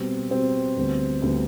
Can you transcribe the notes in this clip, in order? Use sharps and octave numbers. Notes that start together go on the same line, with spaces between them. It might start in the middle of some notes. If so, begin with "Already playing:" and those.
Already playing: B2 G3 B3 C4
B2 G3 B3 C4
D2 D3 G3 B3
D2 D3 G3 B3